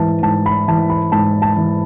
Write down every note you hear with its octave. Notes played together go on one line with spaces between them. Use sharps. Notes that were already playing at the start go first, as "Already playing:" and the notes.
Already playing: G#2 E3 A5
G#2 A5
B5
E3 A5
B5
G#2 A5
A5
E3